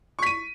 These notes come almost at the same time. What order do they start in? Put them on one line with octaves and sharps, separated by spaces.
C#6 B6 D#7